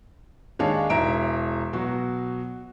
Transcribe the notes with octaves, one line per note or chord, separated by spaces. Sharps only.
D#2 G#3 D4 C#5 F5 A5
E1 E5 A#5 D7
B2 F#3 F#4